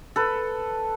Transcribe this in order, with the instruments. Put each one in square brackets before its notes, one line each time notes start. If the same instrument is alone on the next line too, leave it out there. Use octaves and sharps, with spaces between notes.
[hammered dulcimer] A4 B4